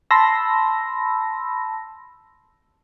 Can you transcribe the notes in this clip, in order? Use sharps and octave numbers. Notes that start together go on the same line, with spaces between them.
A5 B5 C6 E6 A#6